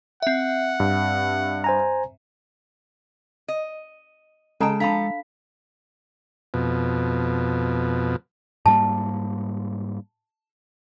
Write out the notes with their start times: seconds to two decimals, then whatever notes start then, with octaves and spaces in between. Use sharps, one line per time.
0.22 C4 E5 F#5
0.80 G2
1.64 C5 G#5 A#5
3.48 D#5
4.61 C#3 G#3 A4 G5 A5 A#5
4.80 F3 D4 A4 F5 A#5 B5 B6
6.54 F2 B2
8.66 G#2 G3 A#3 A5